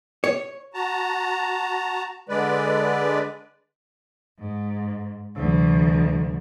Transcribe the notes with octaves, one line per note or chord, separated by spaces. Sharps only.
C#5
F#4 A5 A#5
D3 G#3 B4 D5
G#2
D2 C3 E3 F#3